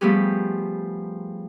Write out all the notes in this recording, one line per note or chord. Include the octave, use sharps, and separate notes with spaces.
F3 G3 A3 B3 G4 G#4